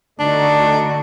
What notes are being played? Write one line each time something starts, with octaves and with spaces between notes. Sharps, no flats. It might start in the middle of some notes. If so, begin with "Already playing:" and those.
D3 A3 D4 D#4 F#4